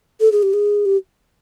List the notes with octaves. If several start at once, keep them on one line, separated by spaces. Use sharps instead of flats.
A4
G#4
G4
G#4
G4